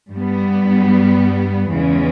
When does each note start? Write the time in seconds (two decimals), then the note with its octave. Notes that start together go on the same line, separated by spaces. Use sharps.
0.10 G2 G3 B3
1.70 E2 C#3 E3 G#3 C#4